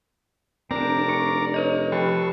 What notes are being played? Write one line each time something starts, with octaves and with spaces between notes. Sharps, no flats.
F1 C4 D4 A#4 D5 A#5
D4 C#6
B4 C#5 D#5
F3 G4 A4 B4 C#6 C7